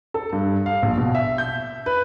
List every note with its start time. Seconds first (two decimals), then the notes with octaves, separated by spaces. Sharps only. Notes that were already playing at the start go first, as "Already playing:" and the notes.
0.14 A4
0.33 G2
0.66 F5
0.83 A#1
0.97 B2
1.15 E5
1.38 G6
1.86 B4